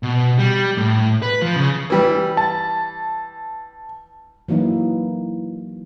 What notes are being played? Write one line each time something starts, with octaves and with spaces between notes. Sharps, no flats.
B2
G3
A2
B4
F3
C#3
E3 G3
A5
E3 F#3 A#3 D#4 E4